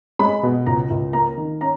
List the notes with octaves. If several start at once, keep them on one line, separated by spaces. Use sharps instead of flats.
G#3 B5
B2
C#2 A#5
C#2
A#3 A#5
D#3
C#4 A#5